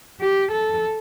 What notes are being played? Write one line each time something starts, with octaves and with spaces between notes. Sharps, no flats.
G4
A4